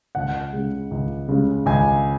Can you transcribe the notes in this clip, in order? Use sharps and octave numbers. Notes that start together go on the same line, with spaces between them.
C#2 F#5
C#3 G#3
C#2
C#3 G#3
C#2 G#5